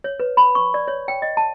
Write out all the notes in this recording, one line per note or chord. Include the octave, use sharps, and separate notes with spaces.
C#5
B4
B5
C#6
D5
C#5
G5
D#5
A5